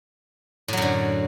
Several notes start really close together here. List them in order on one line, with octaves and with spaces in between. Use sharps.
A2 F#3 F#2 D3